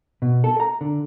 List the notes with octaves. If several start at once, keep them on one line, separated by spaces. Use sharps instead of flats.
B2
A4
A#5
D3